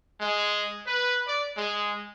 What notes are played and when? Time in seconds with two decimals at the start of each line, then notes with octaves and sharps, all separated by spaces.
0.20 G#3
0.86 B4
1.27 D5
1.57 G#3